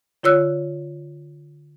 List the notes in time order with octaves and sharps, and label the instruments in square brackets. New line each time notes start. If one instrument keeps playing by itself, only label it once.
[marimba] D3 F4 C#5 E6 F#6